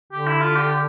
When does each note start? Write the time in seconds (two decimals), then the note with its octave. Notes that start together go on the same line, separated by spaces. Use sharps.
0.12 D3 G4
0.27 E4
0.41 F4
0.56 G4